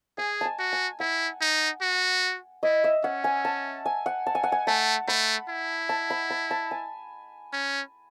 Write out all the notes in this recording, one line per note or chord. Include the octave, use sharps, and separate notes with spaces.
G#4 G#5
G#5 A5
F#4
G#5
E4 F#5
D#4
F#4
E4 D#5
E5
C#4 F#5
G#5
A5
G#5
F#5
A5
G#5
F#5
G#5
A3 A5
A3 B5
E4
A5
B5
B5
A5
G#5
C#4